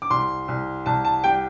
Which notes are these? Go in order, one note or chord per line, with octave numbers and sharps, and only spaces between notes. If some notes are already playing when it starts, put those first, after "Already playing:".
D6
C2 C6
C2
C2 A5
A5
G3 G5